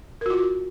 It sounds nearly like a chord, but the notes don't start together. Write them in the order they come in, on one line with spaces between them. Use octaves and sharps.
A#4 F#4 F4